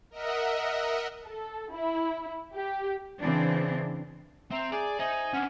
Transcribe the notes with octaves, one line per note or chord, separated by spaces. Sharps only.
A#4 D#5 E5 F#5
A4
E4
G4
C#3 E3 C4 D4
C4 E5 A#5 F7
G#4 D5
D#4 C5 E5 G#5 F#7
C#4 D4 F#5 F6